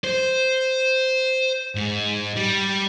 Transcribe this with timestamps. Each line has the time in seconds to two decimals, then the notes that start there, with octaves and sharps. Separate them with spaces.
0.04 C5
1.75 G#2
2.36 G3